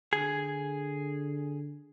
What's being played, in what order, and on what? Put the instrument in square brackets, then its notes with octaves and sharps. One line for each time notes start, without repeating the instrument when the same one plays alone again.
[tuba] D3 [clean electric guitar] G#4